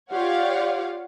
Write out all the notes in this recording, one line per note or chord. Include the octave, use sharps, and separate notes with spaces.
F4 G4 C#5 D5 F5 F#5